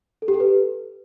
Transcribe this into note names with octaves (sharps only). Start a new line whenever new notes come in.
A4
G4
A4
B4